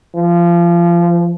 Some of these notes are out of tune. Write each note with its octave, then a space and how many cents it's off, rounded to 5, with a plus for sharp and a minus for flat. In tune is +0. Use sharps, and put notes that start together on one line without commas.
F3 -25